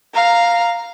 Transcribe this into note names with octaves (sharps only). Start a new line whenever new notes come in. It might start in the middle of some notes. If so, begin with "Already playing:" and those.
F5 A#5